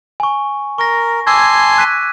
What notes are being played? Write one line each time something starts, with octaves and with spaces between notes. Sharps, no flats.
G#5 C#6
A#4 C#6 A#6
G#5 A5 C6 D6 E6 G#6
F#6 B6 D#7